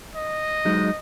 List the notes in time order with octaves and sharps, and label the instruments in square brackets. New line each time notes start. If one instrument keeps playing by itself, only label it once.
[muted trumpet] D#5
[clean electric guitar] F#3 G#3 D#4